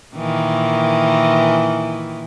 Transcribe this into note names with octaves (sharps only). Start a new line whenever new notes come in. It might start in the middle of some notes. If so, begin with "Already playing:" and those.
A#2 D#3 E3